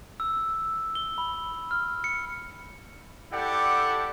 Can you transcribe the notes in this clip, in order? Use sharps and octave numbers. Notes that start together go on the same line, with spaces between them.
E6
G7
B5
F6
C#7
E4 G4 A4 D5 F#5 G5